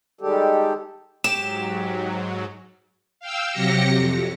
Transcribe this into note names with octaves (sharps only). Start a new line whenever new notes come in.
D#3 G3 G#3 G4 A4
G#2 F#3 G4 E7
F5 G5 E6
C3 F#3 G4 A#6 C#7
F2